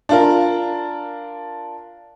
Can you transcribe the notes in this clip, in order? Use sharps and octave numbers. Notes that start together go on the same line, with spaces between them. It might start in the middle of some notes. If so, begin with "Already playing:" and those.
D4 F4 A#4